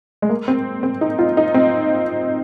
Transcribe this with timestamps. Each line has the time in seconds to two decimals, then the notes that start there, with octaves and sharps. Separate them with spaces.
0.22 G#3
0.29 A#3
0.48 C4
0.83 C4
1.01 D#4
1.19 F4
1.37 D#4
1.54 C4